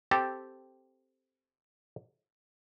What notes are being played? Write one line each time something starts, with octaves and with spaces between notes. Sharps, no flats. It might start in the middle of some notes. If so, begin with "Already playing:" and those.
C4 G4 A4